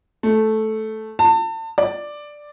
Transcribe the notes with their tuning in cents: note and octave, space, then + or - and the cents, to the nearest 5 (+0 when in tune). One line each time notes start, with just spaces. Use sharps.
A3 -10
A5 +35
D5 +5